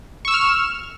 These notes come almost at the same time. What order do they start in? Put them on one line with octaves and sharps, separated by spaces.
C#6 E6 E7 F6